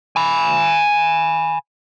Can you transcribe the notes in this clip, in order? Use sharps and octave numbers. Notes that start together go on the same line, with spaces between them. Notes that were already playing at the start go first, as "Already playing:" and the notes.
G#5 B5